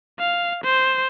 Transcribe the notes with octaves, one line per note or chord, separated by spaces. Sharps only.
F5
C5